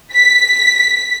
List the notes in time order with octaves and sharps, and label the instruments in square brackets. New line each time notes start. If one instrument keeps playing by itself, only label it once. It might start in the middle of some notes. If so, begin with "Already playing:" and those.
[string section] B6